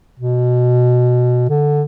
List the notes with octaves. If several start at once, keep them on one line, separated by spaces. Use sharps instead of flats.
B2
D3